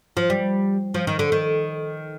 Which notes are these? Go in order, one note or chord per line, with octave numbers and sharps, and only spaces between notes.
F3
G3
F3
D#3
D3
D#3